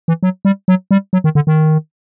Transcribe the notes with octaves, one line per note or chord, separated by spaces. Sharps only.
E3
F#3
G3
F#3
G3
F#3
D#3
D3
D#3